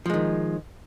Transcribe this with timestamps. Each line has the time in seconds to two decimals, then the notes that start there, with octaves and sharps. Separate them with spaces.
0.06 F3
0.10 G#3
0.14 D#3